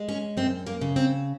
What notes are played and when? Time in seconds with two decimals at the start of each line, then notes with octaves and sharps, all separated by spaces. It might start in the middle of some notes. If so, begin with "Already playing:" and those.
Already playing: G#3
0.09 C#4
0.37 F#2 C4
0.67 A#3
0.81 C#3
0.96 C4